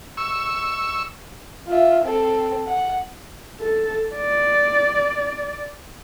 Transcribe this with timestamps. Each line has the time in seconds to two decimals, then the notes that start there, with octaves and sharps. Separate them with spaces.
0.17 C#6 E6
1.67 F4 E5
2.04 C4 A4
2.67 F#5
3.60 A4
4.15 D5